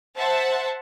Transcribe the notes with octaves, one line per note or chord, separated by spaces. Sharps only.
C5 E5 F#5 A5